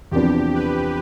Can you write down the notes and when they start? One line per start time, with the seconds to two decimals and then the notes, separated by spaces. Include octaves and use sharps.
0.12 E2 C3 F3 B3 D4 G4
0.54 B4